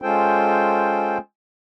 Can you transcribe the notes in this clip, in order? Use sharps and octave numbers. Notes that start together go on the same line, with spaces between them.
G#3 C#4 F4 A4 C5 G5